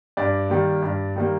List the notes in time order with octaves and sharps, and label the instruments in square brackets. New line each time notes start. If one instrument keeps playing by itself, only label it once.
[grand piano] G2 D5
D#3 G3 A#3
G2
D#3 G3 A#3